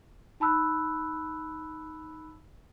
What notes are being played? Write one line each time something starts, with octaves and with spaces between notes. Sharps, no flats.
D#4 A5 B5 E6 F#6